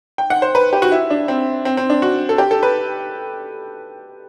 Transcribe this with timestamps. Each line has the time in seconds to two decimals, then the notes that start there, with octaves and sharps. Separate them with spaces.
0.18 G5
0.30 F#5
0.42 C5
0.55 B4
0.73 G4
0.82 F#4
0.92 E4
1.10 D4
1.28 C4
1.65 C4
1.77 C4
1.90 D4
2.02 F#4
2.29 A4
2.38 G4
2.51 A4
2.63 B4